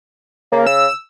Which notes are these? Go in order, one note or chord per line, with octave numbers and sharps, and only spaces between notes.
C#3 A#3
E6